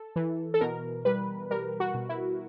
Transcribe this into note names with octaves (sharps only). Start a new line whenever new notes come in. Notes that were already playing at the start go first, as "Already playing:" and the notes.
Already playing: A4
E3
A4
B2 A#4
G3 B4
G3 A#4
F#4
B2
E4